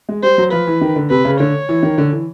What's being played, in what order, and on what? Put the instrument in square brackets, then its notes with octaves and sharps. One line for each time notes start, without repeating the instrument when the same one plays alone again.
[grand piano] G#3
[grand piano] G3 [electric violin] C5
[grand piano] F#3
[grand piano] F3 [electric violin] B4
[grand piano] E3
D#3
D3
[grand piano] C3 [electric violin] B4
[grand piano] C#3
[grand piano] D3 [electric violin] C#5
[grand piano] E3
D#3
D3
E3